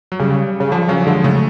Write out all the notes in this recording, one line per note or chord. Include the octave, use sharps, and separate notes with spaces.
F#3
C#3 G3
C#3
D3 F3
C#3 F#3
D3 G#3
C#3 A3